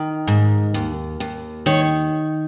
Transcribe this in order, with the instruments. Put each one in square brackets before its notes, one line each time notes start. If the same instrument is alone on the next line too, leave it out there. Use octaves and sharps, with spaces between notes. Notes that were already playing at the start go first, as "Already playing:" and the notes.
Already playing: [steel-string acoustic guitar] D#3
G#2
D#2
D#2
D#3 C#5